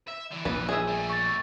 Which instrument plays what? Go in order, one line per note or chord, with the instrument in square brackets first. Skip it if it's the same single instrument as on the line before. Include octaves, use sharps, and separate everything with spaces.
[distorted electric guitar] E5
D3 E3
[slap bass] A#1 [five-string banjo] B4
[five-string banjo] G#4 E5
[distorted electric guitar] G3 A3
[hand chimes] C#6 A6